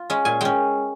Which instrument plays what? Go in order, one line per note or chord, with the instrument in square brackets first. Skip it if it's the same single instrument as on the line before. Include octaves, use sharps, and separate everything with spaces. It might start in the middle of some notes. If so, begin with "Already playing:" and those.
Already playing: [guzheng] F4
G#3 C#4
A#2 G#5
G#3 C#4 G5